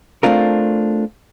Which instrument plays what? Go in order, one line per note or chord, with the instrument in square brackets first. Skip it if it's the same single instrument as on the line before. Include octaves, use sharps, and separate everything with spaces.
[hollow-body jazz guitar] A3 C4 D4 F4 A#4